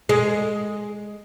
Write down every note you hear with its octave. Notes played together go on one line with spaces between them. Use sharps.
G#3